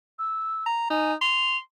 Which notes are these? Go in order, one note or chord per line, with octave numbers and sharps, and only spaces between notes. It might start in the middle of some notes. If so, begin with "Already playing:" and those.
E6
A#5
D#4 G#5
C6 F7